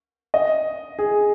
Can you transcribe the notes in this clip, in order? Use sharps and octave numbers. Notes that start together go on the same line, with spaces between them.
D#5
G#4